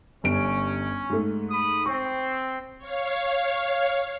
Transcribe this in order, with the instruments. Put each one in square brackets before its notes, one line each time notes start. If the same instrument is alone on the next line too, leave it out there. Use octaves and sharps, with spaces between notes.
[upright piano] G1 D7 [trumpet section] C#4
[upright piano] G#2 A3
[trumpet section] B5 D#6
[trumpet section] C4 [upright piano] C#6
[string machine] C#5 F5